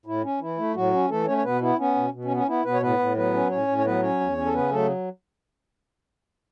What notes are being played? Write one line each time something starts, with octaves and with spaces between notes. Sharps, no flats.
A2 E4
C#4
E3 E4
A3
A2 F#3 F#4
C#4
E3 A3 A4
A3 C#4 C#5
C#5
B2 B3 B4
B3 E4
B3 C#4
B2
B2
C#4
B3
C#4
B3 E4
B2 B3 B4
C#5
A2 B3 B4
A2
F#3 B3 B4
C#4
A2 C#4 C#5
A2
C#5
F#3 B3 B4
C#4 C#5
E2
C#4
A4
C#3 B3 B4
F#3 A3 A4